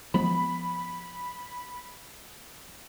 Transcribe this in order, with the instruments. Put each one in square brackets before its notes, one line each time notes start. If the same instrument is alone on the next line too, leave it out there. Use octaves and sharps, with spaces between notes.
[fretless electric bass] F3 G#3 B3 [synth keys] B5